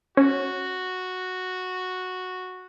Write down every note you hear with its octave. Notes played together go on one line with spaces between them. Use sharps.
C#4 F#4